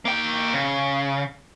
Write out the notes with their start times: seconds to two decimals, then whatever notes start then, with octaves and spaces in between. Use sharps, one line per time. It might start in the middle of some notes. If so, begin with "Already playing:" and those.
0.05 A#3 G5
0.54 C#3